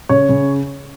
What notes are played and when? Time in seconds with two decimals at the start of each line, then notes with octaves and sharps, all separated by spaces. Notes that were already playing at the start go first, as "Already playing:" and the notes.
0.09 C#3 C#5
0.29 C#3